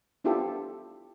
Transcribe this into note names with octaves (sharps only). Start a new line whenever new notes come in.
B3 D4 E4 F4 G4 A4